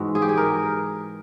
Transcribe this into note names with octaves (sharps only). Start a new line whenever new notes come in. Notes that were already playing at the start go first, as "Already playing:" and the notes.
Already playing: G#2 E3 G#3 F#4
G#4
G4
G#4
A#4